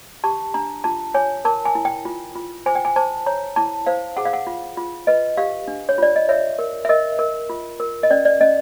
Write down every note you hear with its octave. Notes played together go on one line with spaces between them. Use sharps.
G4 A5
D4 A#5
F4 A5
C#5 G#5
A#4 A5
G#5
E4
G5
F4
F4
C5 G#5
G5
G#5
C5 A5
C#5 A#5
E4 A5
C5 F5
G#4 F#5
F5
F#5
F4
F4
B4 D#5
G4 F5
D4
C#5
F4 D5
D#5
C#5 E5
A#4
E5
A#4 D#5
A#4
F4
A#4
D#5
C#4 D5
D5
C#4 D#5